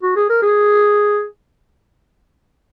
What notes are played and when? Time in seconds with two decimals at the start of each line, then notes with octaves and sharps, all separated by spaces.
0.03 F#4
0.16 G#4
0.29 A#4
0.42 G#4